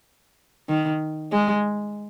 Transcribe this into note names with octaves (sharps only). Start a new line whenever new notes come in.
D#3
G#3